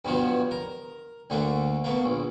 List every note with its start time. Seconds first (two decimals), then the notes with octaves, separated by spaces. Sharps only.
0.05 G2 B2 F3 F#3
0.51 A#4
1.30 D2 D3 A3 A#3
1.84 B2 A3 A#3
2.05 A#1